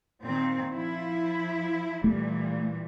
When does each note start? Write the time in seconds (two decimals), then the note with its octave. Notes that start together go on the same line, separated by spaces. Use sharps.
0.23 A#2 D#3 C4
0.73 F3 E4
2.04 A#2 E3 G3 A3